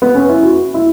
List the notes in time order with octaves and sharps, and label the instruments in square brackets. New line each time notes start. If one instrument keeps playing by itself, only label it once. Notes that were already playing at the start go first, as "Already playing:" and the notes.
[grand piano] B3
C#4
E4
F#4
E4